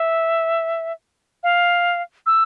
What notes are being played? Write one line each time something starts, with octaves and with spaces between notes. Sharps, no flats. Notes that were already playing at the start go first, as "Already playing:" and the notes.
Already playing: E5
F5
E6